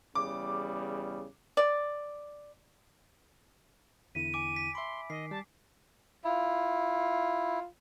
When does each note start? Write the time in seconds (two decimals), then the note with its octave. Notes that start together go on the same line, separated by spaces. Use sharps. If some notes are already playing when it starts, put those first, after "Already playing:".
0.15 E2 C#3 G3 D6
1.57 D5
4.15 E2 D3 E4 B6 D#7
4.33 G#5 D6 D7
4.56 B6
4.75 E5 B5 C6
5.10 D#3 D#5 C7
5.31 G3 A5
6.24 E4 F4